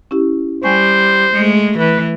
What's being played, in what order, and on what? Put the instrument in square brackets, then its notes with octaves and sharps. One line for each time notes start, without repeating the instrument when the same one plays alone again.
[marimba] C#4 E4 G4
[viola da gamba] G3 [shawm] C5 [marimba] G5 G#5 C#6
[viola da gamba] G#3 A3
[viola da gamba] E3 [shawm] B4